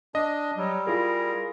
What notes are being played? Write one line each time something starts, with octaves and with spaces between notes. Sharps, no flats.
D4 D#5
F#3 G3
E4 F4 G#4 A#4